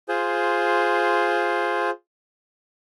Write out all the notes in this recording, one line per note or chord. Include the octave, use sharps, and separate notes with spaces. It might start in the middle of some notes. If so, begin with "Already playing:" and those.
F4 G#4 C5